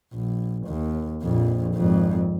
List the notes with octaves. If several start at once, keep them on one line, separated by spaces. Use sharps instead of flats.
A#1
D#2
A#1 F2
G#1 F2